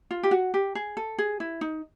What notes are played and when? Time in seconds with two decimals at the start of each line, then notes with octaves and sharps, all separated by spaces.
0.11 F4
0.23 G4
0.31 F#4
0.54 G4
0.75 G#4
0.97 A4
1.18 G#4
1.40 E4
1.61 D#4